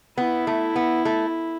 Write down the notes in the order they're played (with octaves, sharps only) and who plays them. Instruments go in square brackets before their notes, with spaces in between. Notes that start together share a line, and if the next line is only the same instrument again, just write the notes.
[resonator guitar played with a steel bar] B3 [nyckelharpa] E4
[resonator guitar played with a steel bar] A3
B3
A3